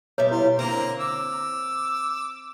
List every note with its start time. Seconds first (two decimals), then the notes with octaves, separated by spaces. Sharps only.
0.18 B2 G3 C#5 E5
0.31 E4 F4
0.59 D3 A#3 C4 A#5
0.99 D6 E6